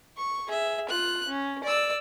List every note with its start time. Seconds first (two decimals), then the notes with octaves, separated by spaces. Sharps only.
0.17 C#6
0.47 G#4 E5
0.89 F4 F#6
1.28 C#4
1.64 D5 E6